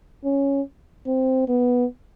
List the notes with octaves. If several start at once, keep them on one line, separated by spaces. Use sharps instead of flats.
C#4
C4
B3